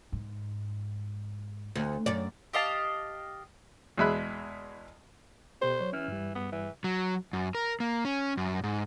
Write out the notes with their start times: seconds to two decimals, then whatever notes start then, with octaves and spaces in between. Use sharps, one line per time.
0.12 G#2
1.75 D2
2.06 F#2 D5
2.53 G4 D#5 F5 A5
3.98 E2 B2 G#3 E5 B5 F#6
5.61 B2 B3 G4 C5
5.80 F#3 C#5
5.93 E3 C#4 F6
6.08 G2 G3
6.35 B3
6.52 E3
6.84 F#3
7.33 F#2
7.55 A#4
7.80 A#3
8.05 C#4
8.37 F#2
8.64 G#2